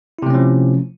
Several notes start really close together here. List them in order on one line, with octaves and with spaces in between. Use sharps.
E4 C3 A3 C#4 F3